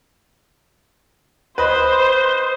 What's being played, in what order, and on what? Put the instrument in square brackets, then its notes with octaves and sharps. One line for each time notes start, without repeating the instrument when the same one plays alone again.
[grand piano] B4 D#5 B5 [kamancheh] C5